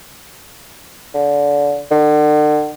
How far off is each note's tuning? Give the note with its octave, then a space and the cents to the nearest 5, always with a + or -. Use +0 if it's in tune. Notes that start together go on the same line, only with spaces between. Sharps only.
D3 -25
D3 +40